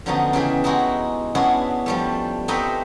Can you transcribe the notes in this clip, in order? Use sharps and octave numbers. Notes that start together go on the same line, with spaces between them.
D3 F3 F#3 B3 C#4 D#4
C#3 E3 G4 G#4
G#3 D#4 E4 F#4 G#4
B3 C#4 D4 E4 F#4 G#4
F3 G3 A3
A3 C4 D#4 G4 B4 D#5